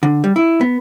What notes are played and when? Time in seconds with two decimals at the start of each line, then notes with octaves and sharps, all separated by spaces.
0.03 D3
0.24 G3
0.36 E4
0.61 B3